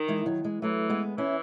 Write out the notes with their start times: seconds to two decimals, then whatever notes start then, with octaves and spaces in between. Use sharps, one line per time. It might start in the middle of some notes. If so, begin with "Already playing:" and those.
Already playing: D#3
0.08 E3 G#3
0.26 D#3 F#3
0.44 E3 G#3
0.62 E3 F#3 A3
0.90 G#3 B3
1.17 E3 C#4 E4